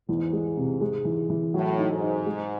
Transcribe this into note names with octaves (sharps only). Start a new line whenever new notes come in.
E2 G#2
G#3
C3
G#3
E3
E3
A2 F#3
D#4
G#2
D#4
G#3